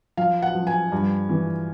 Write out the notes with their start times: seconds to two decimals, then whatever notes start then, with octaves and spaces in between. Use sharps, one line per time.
0.17 F3 F5
0.42 F#5
0.55 F3
0.67 G#5
0.92 G2
1.29 E3